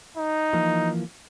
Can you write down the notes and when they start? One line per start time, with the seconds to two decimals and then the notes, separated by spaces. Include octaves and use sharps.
0.17 D#4
0.53 E3 F3 A#3